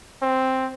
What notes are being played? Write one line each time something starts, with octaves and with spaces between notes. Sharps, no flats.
C4